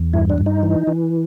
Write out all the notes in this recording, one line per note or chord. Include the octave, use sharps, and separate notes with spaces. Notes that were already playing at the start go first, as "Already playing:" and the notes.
Already playing: E2
G2 E4
D4
G2
D#4
E3
E3